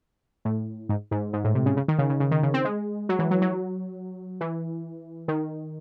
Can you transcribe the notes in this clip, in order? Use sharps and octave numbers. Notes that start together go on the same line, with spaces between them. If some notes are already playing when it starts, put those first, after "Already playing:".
A2
G#2
G#2
G#2
A2
C3
C#3
C#3
D#3
C#3
C#3
C#3
D#3
C#3
C4
G#3
F#3
E3
F#3
F#3
E3
D#3